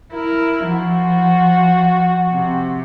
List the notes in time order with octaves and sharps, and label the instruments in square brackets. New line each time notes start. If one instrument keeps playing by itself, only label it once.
[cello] E4 [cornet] A#4
[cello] F3 [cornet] F#4
[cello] C3